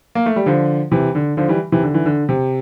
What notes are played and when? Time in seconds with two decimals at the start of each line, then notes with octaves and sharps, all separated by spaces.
0.15 A#3
0.26 A3
0.36 G3
0.46 D3 F3
0.91 C3 E3
1.15 D3
1.37 D3 F3
1.48 E3 G3
1.72 C3 E3
1.83 D3
1.94 E3
2.05 D3
2.29 C3